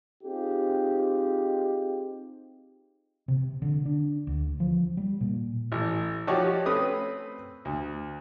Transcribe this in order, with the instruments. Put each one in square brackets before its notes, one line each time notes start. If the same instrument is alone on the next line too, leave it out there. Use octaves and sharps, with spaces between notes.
[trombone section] C4 D#4 F4 G4 G#4
[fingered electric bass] C3
D3
D4
D2
F3
G3
A#2
[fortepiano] A1
F3 D#4 F#4 G4 C#5 D5
A3 C4 C#4 B4 D#6
D2